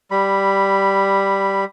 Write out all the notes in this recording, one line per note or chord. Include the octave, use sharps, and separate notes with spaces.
G3 B5